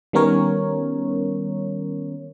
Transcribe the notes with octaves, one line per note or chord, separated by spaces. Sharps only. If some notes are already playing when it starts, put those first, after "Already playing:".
D#3 G3 B3 C#4 A#4 C#5